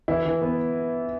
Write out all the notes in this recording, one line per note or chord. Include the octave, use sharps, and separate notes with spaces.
E3 E4
E3
B3